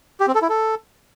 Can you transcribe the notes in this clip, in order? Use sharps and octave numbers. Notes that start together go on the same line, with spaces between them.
G4
C4
A4
E4
A4